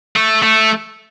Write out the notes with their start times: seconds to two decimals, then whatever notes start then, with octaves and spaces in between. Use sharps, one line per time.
0.16 A3
0.42 A3